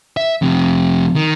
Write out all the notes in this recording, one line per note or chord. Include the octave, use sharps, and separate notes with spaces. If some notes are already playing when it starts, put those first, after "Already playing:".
E5
F2 C3
D#3